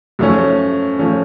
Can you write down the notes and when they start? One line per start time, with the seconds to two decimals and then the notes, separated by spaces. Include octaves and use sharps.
0.19 F#2 F3 A3 C#4
0.99 F3 A3 C#4